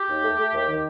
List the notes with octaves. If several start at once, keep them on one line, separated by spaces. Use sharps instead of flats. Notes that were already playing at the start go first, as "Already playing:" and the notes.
Already playing: G4
D#2
A3
A3
D#2
D#3